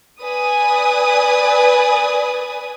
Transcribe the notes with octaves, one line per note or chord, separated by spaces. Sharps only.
B4 D5 G#5 D#6